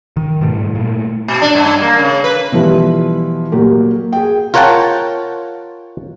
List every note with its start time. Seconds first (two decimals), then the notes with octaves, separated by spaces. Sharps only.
0.17 D#3
0.41 G#2 B2 G3 A3
0.75 A#2 A3
1.28 B2
1.42 D4
1.55 G2
1.82 A#3
1.99 C#3
2.24 B4
2.52 B2 E3 F3 G3
3.52 A#2 F#3 F#4 G4 A#4
4.12 G#4 G5
4.54 F4 A#4 C#5 F#5 G5 A5